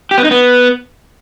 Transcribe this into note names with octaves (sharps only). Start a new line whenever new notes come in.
G4
B3
D#4
B3